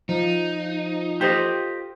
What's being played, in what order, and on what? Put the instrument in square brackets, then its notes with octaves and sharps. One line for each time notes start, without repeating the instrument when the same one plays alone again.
[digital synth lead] F3 [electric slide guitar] D#4
[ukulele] F4 A4 C5 [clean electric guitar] G4 D#5